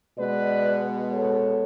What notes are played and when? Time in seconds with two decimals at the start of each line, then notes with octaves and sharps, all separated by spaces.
0.19 B2 G#3 B3 B4 D5
1.11 A4 C#5